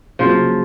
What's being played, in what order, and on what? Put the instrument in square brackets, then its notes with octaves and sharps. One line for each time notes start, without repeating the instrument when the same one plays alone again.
[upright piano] C#3 F#3 A#3 [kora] F3